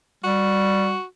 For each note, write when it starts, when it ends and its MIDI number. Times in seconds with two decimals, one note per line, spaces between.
0.24 0.96 55
0.24 1.03 66